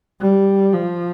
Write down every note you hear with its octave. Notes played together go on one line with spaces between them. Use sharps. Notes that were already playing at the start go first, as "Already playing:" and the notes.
G3
F3